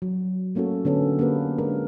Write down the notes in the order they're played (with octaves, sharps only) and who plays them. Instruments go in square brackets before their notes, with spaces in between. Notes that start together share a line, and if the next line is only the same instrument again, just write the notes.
[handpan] F#3
A3 A#3 C#4 F#4 A4
D3 B3 C#4 A4
A#3 G4 A#4 B4
G#3 D4 A#4